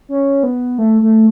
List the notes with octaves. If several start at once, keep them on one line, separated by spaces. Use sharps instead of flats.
C#4
B3
A3
A3